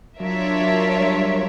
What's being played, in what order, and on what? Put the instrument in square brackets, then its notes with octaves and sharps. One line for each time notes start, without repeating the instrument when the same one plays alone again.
[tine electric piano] F#3 [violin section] D4 F4 A#4 C#5 E5
[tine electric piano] F#3
G3